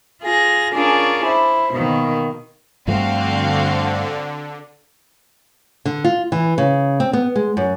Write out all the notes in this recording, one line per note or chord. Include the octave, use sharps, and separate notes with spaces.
F4 G#4 A#6
C#4 D4 F4 G#4 A#4
E4 C5
B2 D#3 A#3
G2 D3 F3 A3 C4 F#4 F5
D3
F4
E3
C#3
C4
B3
G#3
F#2